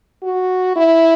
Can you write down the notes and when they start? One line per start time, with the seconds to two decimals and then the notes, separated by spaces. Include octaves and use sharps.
0.23 F#4
0.76 E4